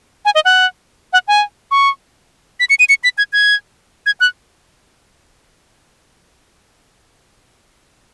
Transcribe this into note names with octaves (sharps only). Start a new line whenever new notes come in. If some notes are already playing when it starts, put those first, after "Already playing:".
G#5
D#5
F#5
F#5
G#5
C#6
B6
C#7
D#7
C#7
B6
G#6
G#6
G#6
F#6